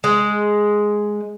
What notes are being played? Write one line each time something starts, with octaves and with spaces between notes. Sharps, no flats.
G#3